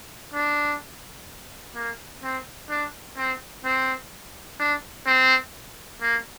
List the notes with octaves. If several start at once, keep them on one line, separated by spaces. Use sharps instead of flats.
D4
A#3
C4
D4
C4
C4
D4
C4
A#3